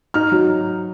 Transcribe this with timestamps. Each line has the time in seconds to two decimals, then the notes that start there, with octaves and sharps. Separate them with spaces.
0.14 D#4 F6
0.32 F#3